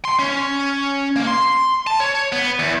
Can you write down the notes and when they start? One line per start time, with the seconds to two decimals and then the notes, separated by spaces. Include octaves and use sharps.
0.05 C6
0.19 C#4
1.16 A#3
1.27 C6
1.87 A5
2.00 C#5
2.32 B3
2.59 E2